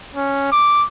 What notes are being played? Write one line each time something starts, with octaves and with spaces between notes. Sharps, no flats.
C#4
D6